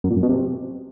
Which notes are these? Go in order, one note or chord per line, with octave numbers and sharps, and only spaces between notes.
F#2
A#2
F#2
B2
C3